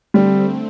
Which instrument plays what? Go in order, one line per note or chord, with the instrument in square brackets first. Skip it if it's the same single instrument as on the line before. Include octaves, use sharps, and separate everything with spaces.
[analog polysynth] D3 A3 C4 [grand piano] G3